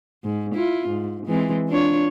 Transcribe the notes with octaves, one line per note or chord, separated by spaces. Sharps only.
G#2
E4 F4
G#2
E3 G#3 C4
D4 F4 C#5